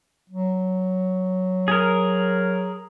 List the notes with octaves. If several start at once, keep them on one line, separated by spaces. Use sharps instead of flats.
F#3
G#4 A#4